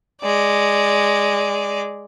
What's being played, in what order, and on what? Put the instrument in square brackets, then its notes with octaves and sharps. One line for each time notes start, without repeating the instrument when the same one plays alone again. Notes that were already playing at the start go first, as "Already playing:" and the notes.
[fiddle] G#3 D5